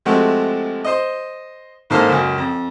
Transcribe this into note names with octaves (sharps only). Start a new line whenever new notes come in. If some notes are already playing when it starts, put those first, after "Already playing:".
C3 F3 G#3 A3 F#4
C5 D#5
A1 G#2 A#3 A4 C5 F6
C#2 F#2
F2